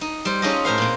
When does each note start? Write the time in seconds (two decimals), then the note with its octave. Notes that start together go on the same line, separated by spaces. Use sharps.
0.01 D#4
0.25 G3 C5
0.42 C#4 D#4 F4 G#4 A4 D#5
0.65 A2 A#4 C5 F5
0.78 A#2 C4